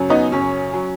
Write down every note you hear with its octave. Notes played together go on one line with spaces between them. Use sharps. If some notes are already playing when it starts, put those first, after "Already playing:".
Already playing: F#2 C#3 F#3
B3 D#4
F#2 C#3 F#3 C#4
F#3